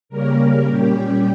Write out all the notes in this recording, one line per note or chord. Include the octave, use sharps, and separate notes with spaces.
C#3 G3 A#3 C#4 A#4
A#2 G3 C#4 G4